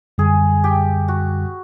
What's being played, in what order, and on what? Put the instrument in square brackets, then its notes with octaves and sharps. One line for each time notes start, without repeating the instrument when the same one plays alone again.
[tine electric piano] F#2 D3 G3 [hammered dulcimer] G#4
[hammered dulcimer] G4
F#4